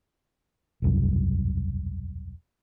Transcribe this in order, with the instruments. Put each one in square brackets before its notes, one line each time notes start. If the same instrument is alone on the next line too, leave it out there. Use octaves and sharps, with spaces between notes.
[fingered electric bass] E1 C2 F#2